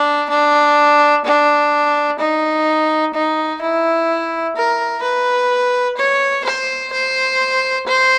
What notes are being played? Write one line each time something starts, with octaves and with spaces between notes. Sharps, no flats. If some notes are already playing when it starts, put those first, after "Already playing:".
Already playing: D4
D4
D4
D#4
D#4
E4
A#4
B4
C#5
C5
C5
C5